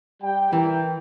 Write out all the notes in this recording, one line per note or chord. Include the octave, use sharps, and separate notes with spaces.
G3 G5
E3 E4 A#4 G5